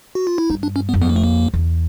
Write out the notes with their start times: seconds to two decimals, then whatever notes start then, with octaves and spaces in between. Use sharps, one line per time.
0.15 F#4
0.27 F4
0.38 E4
0.50 G2 D#4
0.63 D4
0.76 C#4
0.89 B3
0.93 F#2
1.01 F2 B3
1.09 A#3
1.16 A3
1.24 A#3
1.54 E2